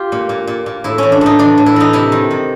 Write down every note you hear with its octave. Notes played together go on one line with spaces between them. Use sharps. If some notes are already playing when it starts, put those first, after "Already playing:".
Already playing: F4 G4
A#2
A#2
A#2
A#2
A2 E4
E3 C#4
D4
A2 D#4
E3 D4
A2
E4
E3 D#4
C3 E4
D#3
C3